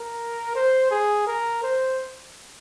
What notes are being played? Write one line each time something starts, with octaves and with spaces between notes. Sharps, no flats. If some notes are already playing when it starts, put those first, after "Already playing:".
Already playing: A#4
C5
G#4
A#4
C5